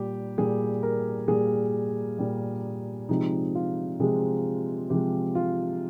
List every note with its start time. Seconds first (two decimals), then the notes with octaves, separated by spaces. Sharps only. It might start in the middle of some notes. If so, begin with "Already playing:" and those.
Already playing: A#2 G3 G4
0.38 A#2 G3 G#4
0.83 A#4
1.28 A#2 G3 G#4
2.18 A#2 G3
3.09 C3 F3 G#3 D#4
3.55 F4
4.00 C3 F3 G#3 G#4
4.90 C3 F3 G#3 G4
5.35 F4